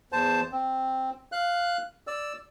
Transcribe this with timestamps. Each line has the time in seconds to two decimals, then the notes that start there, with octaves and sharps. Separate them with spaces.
0.12 E2 C5 A5
0.52 C4
1.32 F5 F#6
2.07 D5 E6